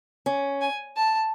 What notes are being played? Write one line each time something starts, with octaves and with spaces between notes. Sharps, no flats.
C#4
G#5
A5